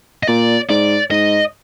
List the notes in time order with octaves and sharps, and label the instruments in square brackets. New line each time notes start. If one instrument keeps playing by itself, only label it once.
[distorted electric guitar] D#5
[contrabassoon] A#2 [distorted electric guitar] D5
[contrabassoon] G#2 [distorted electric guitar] D5
[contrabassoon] G#2 [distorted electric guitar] D#5